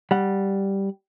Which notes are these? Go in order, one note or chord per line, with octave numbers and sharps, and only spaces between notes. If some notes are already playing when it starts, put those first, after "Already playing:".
G3 F#5